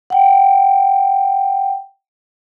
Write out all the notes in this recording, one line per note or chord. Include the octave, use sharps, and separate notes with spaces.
F#5 G5